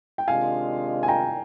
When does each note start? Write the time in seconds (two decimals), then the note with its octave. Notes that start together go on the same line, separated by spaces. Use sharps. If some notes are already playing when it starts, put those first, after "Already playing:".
0.18 G5
0.27 C3 D#3 G#3 D4 F4 F5 G#5
1.03 G#5
1.08 G5 A#5